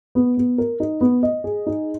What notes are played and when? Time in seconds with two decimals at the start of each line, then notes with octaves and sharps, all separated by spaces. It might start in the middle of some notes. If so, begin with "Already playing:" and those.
0.15 B3
0.38 B3
0.58 A#4
0.80 D#4
1.01 B3
1.23 D#5
1.44 G#4
1.66 D#4